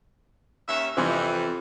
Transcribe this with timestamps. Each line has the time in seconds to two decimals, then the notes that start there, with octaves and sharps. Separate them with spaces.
0.68 D#2 C#4 E5
0.97 F2 C3 E3 C4